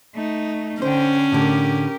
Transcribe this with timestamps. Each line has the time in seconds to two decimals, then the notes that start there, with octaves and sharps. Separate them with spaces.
0.15 A3 D#4
0.82 D3 C#4 C5 G5
1.32 A2 D3 G4 A#4